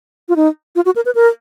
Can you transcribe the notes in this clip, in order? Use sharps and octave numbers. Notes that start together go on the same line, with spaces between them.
F4
D#4
F4
F#4
A#4
B4
A#4